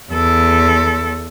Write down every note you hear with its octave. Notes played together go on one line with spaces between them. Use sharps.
E2 A4